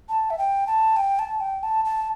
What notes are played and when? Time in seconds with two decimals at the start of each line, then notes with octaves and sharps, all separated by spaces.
0.09 A5
0.30 E5
0.38 G5
0.67 A5
0.96 G5
1.19 A5
1.40 G5
1.63 A5
1.85 A5